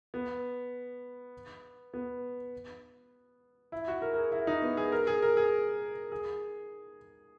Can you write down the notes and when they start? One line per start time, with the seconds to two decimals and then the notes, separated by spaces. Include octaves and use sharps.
0.14 B3
1.94 B3
3.72 E4
3.88 F#4
4.02 A#4
4.14 A#4
4.17 G#4
4.32 E4
4.47 D#4
4.62 B3
4.77 G#4
4.92 A#4
5.07 G#4
5.22 A#4
5.37 G#4
6.12 G#4